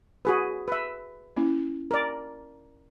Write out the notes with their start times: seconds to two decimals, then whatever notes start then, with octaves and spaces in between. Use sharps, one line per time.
0.25 F#4 G#4 B4
0.68 B4 E5
1.37 A#3 C#4 E4
1.91 A#4 D5